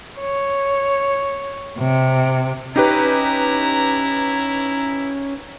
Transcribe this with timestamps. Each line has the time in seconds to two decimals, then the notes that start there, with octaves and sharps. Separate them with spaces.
0.19 C#5
1.77 C3
2.76 C#4 D#4 E4 G4 B4 A#5